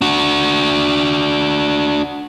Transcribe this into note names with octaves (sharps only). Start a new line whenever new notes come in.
D4 F#4